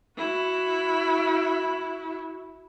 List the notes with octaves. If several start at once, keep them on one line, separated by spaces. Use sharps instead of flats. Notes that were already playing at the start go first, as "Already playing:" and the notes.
E4 F#4